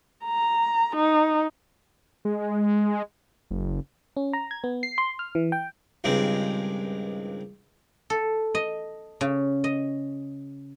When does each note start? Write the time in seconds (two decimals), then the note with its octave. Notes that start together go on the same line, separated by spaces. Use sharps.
0.25 A#5
0.96 D#4
2.25 G#3
3.51 F#1
4.17 C#4
4.33 A#5
4.51 G#6
4.64 B3
4.83 C7
4.98 C6
5.19 F6
5.35 E3
5.52 G5
6.04 C#2 G2 D#3 G#3 C4
8.10 A4
8.55 D#5
9.21 C#3
9.64 D#5